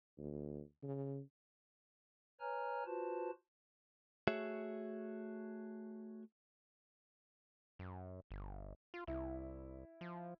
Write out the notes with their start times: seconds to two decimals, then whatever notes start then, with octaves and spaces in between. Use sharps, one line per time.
0.19 D2
0.83 C#3
2.40 B4 C#5 G#5 A#5 F6
2.86 F4 F#4 B4 C5 A5
4.28 A3 F#4 G#4 C#5 E5
7.79 F#2
8.31 G1
8.94 F4
9.07 C2 E4
10.01 F3